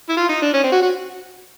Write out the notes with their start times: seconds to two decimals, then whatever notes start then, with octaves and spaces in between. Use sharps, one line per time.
0.09 E4
0.17 F4
0.29 D#4
0.42 D4
0.53 C#4
0.64 C4
0.72 F#4
0.82 F#4